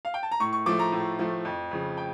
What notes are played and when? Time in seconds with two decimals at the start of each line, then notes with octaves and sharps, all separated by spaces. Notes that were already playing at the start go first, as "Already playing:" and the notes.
0.05 F5
0.14 G5
0.23 A5
0.31 A#5
0.40 A2 C#6
0.53 C#6
0.66 F3 A3 D6
0.79 A#5
0.92 A2
1.19 F3 A3
1.45 F2
1.71 C#3 F3
1.98 G5